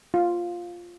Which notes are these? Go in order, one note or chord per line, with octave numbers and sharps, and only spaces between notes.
F4